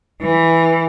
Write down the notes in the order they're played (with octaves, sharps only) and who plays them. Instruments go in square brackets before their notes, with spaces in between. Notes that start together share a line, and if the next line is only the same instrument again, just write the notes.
[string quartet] E3